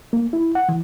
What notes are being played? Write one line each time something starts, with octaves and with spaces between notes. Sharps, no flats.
A#3
E4
F#5
E3